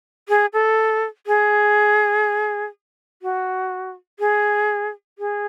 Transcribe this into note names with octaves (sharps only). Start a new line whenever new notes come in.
G#4
A4
G#4
F#4
G#4
G#4